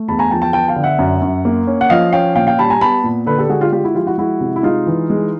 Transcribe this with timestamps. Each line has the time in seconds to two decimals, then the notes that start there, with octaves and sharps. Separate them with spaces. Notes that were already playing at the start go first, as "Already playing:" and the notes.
Already playing: A3
0.08 E2 A5 B5
0.19 G#5 A#5
0.31 F3 G5 A5
0.42 G5 A5
0.53 B3 G5 A5
0.68 F5 G5
0.76 D3
0.84 E5 F#5
0.99 F#2
1.22 F#2
1.45 A#3
1.67 C#4
1.81 F#5
1.90 F3 D#5 F5
2.13 C#4 F5 G5
2.36 A#2 F5 G5
2.47 F5 G5
2.59 G3 A5 B5
2.70 G#5 A#5
2.81 B3 A5 B5
3.04 A#2
3.26 D3 A4 B4
3.38 G4 A4
3.49 G#3 F#4 G#4
3.61 F4 G4
3.72 G#3 F4 G4
3.84 E4 F#4
3.95 F3 F4 G4
4.07 E4 F#4
4.18 G#3 E4 F#4
4.41 C3
4.56 E4
4.63 G#3 D#4 F4
4.86 E3
5.10 G#3